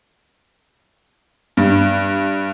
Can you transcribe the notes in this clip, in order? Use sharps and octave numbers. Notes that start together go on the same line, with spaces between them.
G2